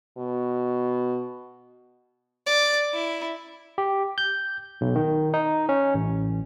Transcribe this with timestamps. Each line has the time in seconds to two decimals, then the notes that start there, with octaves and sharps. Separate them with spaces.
0.18 B2
2.46 D5
2.94 E4
3.78 G4
4.18 G6
4.81 B1
4.95 D#3
5.34 D#4
5.69 C#4
5.94 A1